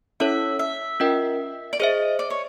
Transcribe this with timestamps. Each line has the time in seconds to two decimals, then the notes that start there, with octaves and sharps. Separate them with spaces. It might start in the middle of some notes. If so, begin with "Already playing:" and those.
0.20 C#4 E4 A4 C#5 E5
0.59 E5
1.00 C#4 F4 A#4 D#5 G5
1.73 D5
1.80 G#4 C5 D#5 E5
2.19 D5
2.30 C#5